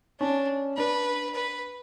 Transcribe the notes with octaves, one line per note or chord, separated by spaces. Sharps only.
C#4 D4
D4 B4
B4